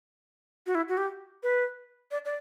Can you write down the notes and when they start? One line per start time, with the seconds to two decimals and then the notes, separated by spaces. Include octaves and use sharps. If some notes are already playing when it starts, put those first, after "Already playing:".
0.66 F#4
0.75 E4
0.89 F#4
0.97 G4
1.43 B4
2.11 D5
2.25 D5